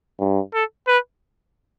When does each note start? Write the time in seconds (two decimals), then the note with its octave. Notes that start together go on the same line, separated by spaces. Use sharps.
0.19 G2
0.54 A4
0.88 B4